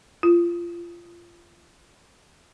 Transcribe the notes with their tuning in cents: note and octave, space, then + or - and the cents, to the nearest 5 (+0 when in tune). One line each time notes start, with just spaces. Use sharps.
F4 -20